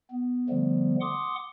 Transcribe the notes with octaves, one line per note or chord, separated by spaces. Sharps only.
B3
D3 F3 G3 A3 B3
F#5 C6 D6 D#6